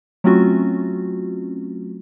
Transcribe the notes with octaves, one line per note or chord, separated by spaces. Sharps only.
F#3 A3 C4 C#4 F4 F#4